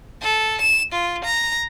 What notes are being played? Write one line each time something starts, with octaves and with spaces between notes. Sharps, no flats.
A4
E7
F4
A#5